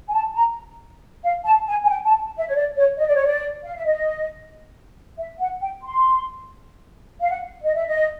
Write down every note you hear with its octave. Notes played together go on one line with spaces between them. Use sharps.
G#5
A5
A#5
F5
A5
G#5
G#5
G5
A5
E5
C#5
D5
C#5
D#5
D5
C#5
D5
F5
E5
D#5
E5
F#5
G5
C6
F5
F#5
D#5
E5
D#5